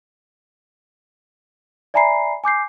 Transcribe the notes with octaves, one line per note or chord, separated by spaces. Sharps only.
D5 E5 G#5 A#5 B5 C7
G#5 D6 G6 C7